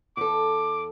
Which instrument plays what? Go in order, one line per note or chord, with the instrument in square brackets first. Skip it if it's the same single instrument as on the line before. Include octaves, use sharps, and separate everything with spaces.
[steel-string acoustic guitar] E2 A4 [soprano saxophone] D6